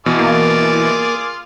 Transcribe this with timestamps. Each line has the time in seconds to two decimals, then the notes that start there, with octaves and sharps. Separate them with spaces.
0.06 B2 E3 F4 G#4 D5
0.19 A#3